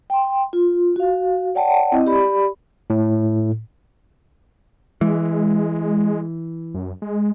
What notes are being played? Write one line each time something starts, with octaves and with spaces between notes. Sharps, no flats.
G5 C6
F4
F#4 F5
C#5 D5 F#5 G5 A5
C4 E4 D#5
G4 D5 B5
A2
E3 G#3
F#2
G#3